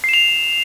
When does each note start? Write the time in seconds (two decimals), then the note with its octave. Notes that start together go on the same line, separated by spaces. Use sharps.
0.04 C7
0.09 E7
0.14 F7